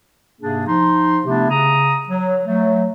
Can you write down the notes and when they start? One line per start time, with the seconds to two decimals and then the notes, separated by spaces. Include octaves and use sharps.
0.41 G#2 C3 A#3 D4 G#4
0.67 F3 D#4 C6
1.25 C3 A3 B3 D4 E4 G4
1.50 C#3 A#5 D#6
2.08 F#3
2.46 F#3 A3